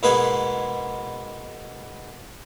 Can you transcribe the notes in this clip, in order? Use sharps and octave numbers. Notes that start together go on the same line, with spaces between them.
G#2 B2 A#3 B3 G#4 B4